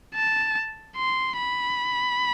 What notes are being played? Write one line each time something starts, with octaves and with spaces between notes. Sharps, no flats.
A5
C6
B5